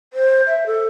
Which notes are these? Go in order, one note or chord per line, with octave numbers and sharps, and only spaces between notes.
C5
E5
A4